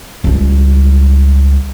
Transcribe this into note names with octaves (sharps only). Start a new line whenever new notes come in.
C#2 G3